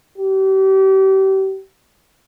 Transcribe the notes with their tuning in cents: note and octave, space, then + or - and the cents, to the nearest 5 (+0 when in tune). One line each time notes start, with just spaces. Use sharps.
G4 -35